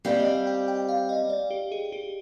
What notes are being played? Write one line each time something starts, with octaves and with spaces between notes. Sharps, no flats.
G3 C4 G4 F5
D#5
F5
G5
G5
F5
D#5
D5
G4
G#4
G4